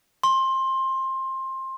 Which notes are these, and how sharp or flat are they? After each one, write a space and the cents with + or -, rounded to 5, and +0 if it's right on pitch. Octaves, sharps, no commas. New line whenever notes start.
C6 +20